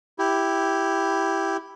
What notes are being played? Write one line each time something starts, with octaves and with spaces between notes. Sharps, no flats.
E4 G4